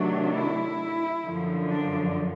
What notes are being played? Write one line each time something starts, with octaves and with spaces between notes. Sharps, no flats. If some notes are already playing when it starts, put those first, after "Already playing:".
Already playing: C3 D#3 F#3 A3 D4
E4
F#2 D3 F3
D4